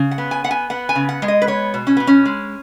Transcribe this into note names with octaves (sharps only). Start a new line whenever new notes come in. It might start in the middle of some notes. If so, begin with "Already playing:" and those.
Already playing: C#3
F#5
B3
G#5
B3 F#5
G#5
B3 F#5
G#5
C#3
F#5
G#3
D#5
B4
B3 C#5
B2
C#4
B2 B3
C#4
G#3